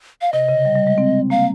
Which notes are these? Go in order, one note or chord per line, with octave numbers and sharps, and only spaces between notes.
F5
C3 D#5
C#3
G3
G3
G#3
C4
A#3 F5